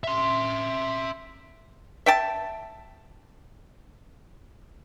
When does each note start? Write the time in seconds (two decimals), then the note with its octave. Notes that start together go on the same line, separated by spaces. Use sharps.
0.04 E5 C6
2.06 E5 G5 A5